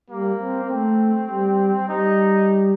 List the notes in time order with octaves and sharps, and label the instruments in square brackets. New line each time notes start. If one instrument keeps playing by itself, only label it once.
[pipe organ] G3 [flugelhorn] A#3
[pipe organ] C4
[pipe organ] A3 [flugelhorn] C4
[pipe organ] G3
[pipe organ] G3 [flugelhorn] D#4